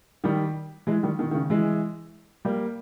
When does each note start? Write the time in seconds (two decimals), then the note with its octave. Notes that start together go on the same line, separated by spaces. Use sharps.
0.24 D#3 G3
0.87 E3 G#3
1.03 D#3 G3
1.18 B2 D#3
1.31 D#3
1.34 C#3
1.50 E3 G#3
2.45 G3 A#3